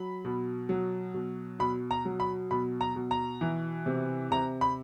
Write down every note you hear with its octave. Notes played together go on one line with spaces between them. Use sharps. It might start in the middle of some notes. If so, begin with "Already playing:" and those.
Already playing: F#3 B5
B2
F#3
B2
B2 B5
A#5
F#3
B5
B2 B5
A#5
B2
A#5
E3
C3
C3 A#5
B5